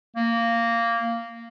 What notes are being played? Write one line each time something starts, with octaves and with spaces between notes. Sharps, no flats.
A#3